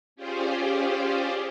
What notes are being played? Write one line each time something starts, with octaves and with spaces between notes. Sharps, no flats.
C#4 F4 G4 G#4 C5 D5